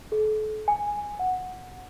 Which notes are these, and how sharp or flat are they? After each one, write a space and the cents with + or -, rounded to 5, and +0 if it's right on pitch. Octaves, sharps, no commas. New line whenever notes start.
A4 -40
G#5 -5
F#5 -5